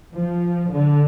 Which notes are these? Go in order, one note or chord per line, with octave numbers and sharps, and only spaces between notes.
F3
D3